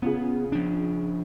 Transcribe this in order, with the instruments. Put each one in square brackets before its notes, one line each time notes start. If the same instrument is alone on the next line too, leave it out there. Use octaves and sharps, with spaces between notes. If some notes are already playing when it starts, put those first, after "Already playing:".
[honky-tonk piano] C#3 F4 G#4 [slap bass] B3
[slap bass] F3 D4